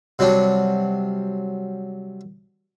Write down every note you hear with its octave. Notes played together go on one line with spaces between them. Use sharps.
C3 F#3 G3 D4